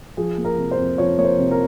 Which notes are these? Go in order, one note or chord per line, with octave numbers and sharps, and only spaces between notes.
F3 G#4
A#3
A#4
C3
C5
F2
F3 C#5
A#3 C#5
C5
C3
A#4